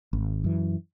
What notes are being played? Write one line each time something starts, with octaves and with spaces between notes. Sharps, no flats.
G#1
F#2 E3